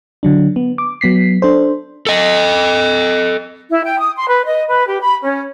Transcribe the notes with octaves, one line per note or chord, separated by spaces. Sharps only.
D3 F#3 D4
B3
D6
F#3 B3 B6 C7
D4 A4 C5
A4 D#5
E4
G5
D#6
C6
B4
D#5
B4
G4
B5
C#4